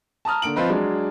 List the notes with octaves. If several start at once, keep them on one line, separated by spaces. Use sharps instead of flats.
A5 A#5 D#6 F6
D3 A#3 D7 F#7
F3 C4 F4 B4 D#5
F#3 G#3 D4